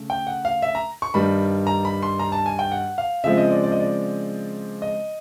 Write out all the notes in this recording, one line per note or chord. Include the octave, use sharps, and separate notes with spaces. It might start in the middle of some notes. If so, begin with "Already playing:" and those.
Already playing: C#3 A3
G5
F#5
F5
E5
A#5
C#6
G2 D#3 G3 B5
A#5
B5
C6
A#5
A5
G#5
G5
F#5
F5
C#3 F3 G#3 C4 E5
D#5
D5
D5
D#5
D5
D#5